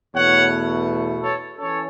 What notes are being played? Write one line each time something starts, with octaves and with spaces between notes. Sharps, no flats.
E2 B2 A3 C#5 F#5
A4 C#5
E3 C#4 A4 C#5